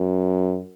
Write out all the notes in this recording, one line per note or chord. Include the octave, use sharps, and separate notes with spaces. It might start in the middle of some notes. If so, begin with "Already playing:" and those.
Already playing: F#2